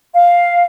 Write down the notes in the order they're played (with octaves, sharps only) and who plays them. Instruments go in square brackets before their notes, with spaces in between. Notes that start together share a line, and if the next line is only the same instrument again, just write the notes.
[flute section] F5